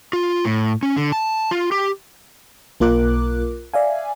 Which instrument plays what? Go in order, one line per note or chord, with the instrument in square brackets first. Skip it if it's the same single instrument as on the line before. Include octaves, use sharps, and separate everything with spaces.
[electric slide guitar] F4
A2
C#4
D3
A5
F4
G4
[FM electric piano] B1 A#3 F4 A#4 D6 F#6
D5 E5 F5 G#5